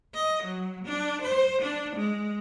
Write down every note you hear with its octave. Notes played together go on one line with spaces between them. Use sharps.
D#5
F#3
D4
C5
D4
G#3